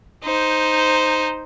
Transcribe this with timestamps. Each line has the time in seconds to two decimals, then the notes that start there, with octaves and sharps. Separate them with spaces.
0.24 D#4 C5